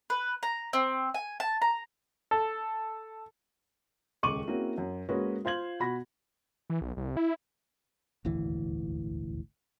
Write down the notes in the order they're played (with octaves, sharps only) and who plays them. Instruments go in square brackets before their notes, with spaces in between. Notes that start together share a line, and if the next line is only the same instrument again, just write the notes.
[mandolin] B4
A#5
C4
G#5
A5
A#5
[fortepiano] A4
[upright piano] D#1 C#2 C#6 D6 D#7 F#7
A#3 C4 C#4 E4 F#4 G#4
F#2
G#3 A#3 C#4 F#4 B4
F4 C5 F5 G#6 F#7
B2 F#4 B5 A#6
[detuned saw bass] E3
B1
C2
E4
[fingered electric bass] D#1 G#1 D2 E3